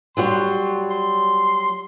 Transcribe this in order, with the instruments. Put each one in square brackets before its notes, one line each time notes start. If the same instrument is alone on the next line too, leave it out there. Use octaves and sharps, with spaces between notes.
[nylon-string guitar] F#3 G3 F#4 [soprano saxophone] C6
[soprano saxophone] C6